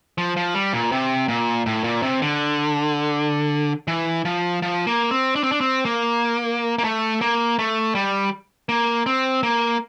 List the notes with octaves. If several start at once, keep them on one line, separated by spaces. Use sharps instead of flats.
F3
F3
G3
A#2
C3
A#2
A2
A#2
C3
D3
E3
F3
F3
A#3
C4
D4
C4
D4
C4
A#3
A#3
A3
A#3
A3
G3
A#3
C4
A#3